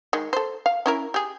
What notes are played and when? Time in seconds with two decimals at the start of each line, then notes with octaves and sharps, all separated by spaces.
0.13 D#3 G#3
0.33 A4 C5
0.66 F5
0.86 C#4 E4 A#4
1.14 G4 G#4